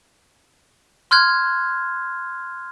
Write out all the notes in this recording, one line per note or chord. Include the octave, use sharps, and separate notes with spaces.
C6 F6 F#6 G#6